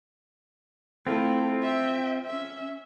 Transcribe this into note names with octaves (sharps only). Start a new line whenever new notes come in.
A3 C4 E4 F4
E5 G5
C#4 E5